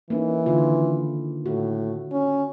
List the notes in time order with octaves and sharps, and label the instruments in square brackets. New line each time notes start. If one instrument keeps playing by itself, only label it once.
[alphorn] E3 [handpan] A#3 C#4 D#4
[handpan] D3 D#3 F4
[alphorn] A2 [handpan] F#4
[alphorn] C#4